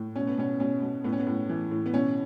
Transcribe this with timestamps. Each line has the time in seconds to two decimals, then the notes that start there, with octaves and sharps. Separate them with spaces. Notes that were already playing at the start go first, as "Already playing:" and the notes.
Already playing: A2
0.15 B2 C#4
0.27 B3
0.38 B2 C#4
0.60 B2 C#4
0.82 B2
1.04 A2 B3
1.13 C#4
1.20 B3
1.27 A2
1.49 E3
1.71 A2
1.86 B3
1.94 B2 C#4